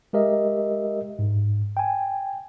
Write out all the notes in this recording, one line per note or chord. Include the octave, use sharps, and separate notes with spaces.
G#3 G4 A#4 D#5 E5
G#2
G5 G#5